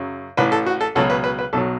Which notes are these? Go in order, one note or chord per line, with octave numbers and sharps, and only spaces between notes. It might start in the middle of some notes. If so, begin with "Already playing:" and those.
Already playing: F#2 C#3 F#3
A1 A2 E3 B4
A4
F#4
A4
C#2 B2 F#3 A4
B4
B4
B4
B1 B2 F#3 A4